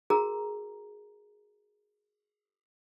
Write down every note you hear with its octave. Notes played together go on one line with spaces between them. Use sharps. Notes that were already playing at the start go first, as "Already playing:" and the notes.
F#4 G#4 A#4 A#5